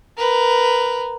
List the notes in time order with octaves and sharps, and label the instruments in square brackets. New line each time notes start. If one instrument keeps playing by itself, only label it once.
[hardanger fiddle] A#4 B4